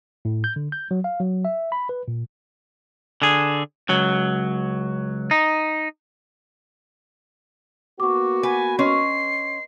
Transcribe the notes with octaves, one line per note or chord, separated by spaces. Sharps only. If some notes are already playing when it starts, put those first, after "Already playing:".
A2
G6
D3
G6
F#3
F5
F#3
E5
B5
B4
A#2
D3 G#4
C#2 F#3
D#4
A#3 B3 F#4 C#6 D6
B4 G#5
C#4 D#5 C6 C7